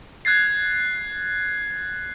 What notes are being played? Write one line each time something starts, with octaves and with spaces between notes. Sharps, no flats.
F#6 G#6 A6 C7